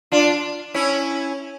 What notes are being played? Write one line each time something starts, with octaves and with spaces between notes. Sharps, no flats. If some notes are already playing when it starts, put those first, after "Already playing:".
D4 F4
C#4 E4